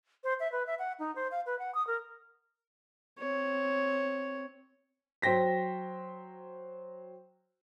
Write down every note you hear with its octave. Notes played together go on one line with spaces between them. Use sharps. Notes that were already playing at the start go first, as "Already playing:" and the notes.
C5
E5
B4
E5
F#5
D#4
C5
F5
B4
F#5
D#6
A#4
C4 C#5
F#3 C5 G5 A#6 B6